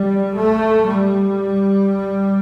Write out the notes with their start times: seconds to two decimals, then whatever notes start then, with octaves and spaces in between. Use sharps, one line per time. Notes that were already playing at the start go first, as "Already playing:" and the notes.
Already playing: G3
0.35 A3
0.87 G3